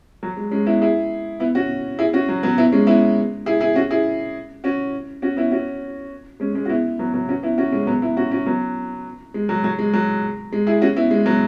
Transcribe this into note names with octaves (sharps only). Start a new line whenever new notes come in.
F#3
G#3
G#3 C#4
B3 E4
E4 G#4
B3 E4
C#4 F#4
E4 G#4
C#4 F#4
F#3
F#3 B3
B3 E4
G#3 C#4
B3 E4
E4 G#4
E4 G#4
C#4 F#4
E4 G#4
C#4 F#4
C#4 F#4
B3 E4
C#4 F#4
G#3 C#4
G#3 C#4
F#4
B3 E4
F#3 B3
F#3 B3
C#4 F#4
B3 E4
C#4 F#4
G#3 C#4
F#3 B3
B3 E4
C#4 F#4
C#4 F#4
F#3 B3
G#3
F#3
F#3
G#3
F#3
G#3
E4 G#4
C#4 F#4
B3 E4
G#3
F#3 B3